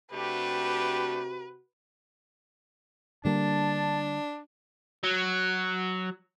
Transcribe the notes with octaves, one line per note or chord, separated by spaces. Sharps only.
C3 A3 D4 F#4 G4 B4
D3 G3 A#3 D4 A5
F#3